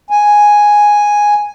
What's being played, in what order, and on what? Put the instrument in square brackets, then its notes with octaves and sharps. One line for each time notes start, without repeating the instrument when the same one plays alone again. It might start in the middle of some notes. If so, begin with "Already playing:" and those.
[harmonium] G#5